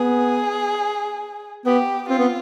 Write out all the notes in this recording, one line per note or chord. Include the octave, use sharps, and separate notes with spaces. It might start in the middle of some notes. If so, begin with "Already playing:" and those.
Already playing: B3 G#4
B3 G4
C4 F4
B3